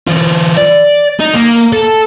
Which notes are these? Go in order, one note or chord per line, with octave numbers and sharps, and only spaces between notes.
E3 F4
D5
D#4
A#3
A4